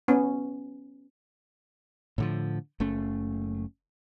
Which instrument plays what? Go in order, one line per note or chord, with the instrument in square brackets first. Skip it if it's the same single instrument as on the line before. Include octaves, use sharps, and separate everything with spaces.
[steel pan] B3 C#4
[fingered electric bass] A2 D3 F3
F#1 A3 C#4